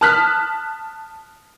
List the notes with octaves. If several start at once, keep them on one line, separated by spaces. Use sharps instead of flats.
A5 D#6 F6 F#6 B6